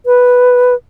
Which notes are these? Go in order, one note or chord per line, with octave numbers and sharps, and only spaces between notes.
B4